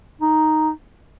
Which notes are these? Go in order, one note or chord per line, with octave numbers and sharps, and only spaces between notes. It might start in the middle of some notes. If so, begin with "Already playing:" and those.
D#4